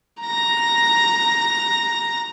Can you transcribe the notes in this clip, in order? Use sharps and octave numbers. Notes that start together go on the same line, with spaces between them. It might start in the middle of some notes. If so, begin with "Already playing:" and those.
A#5 A#6